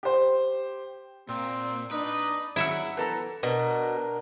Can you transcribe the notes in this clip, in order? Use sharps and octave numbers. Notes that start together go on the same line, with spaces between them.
G4 C5
A#2 C4
D4 D#4 B4
F#3 E4 E5 F#5 E6
E3 A4 A#5
B2 D4 A#4